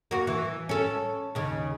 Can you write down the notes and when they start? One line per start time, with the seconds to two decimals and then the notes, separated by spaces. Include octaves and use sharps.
0.11 A#3 F#4
0.27 E3
0.69 C#4 A4
1.35 D#2 C#3